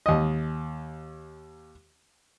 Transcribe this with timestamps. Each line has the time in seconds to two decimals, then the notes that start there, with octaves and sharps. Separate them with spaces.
0.06 D#2 D#5